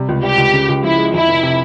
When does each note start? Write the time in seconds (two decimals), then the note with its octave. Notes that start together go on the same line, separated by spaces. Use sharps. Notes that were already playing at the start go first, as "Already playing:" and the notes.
Already playing: C3 G3
0.09 C#2
0.23 G3 G4
0.38 C#2
0.53 C#3
0.69 C#2
0.83 F3 E4
0.98 G#3
1.13 F2 E4
1.29 F1
1.43 C3